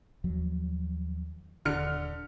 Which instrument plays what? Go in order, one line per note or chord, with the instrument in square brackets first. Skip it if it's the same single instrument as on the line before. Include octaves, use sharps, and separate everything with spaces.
[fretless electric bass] D#2 F3 F#3
[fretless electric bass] D#1 [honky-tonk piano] D3 F6 C#7